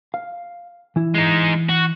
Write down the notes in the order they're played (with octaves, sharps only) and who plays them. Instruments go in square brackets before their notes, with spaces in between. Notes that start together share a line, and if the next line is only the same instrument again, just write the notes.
[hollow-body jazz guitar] F5
E3 E4
[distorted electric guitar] G#3 D#4
F#4